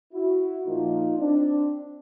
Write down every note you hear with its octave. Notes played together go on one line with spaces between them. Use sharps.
E4 F#4
A#2 F3 A#3 D#4 F4
C4 D4